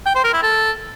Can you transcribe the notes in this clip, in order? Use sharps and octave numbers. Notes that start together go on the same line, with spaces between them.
G5
C5
A#4
E4
A4